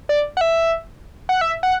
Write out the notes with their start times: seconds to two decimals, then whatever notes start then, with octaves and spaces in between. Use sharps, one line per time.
0.09 D5
0.37 F#5
0.41 E5
1.29 F#5
1.41 E5
1.63 F#5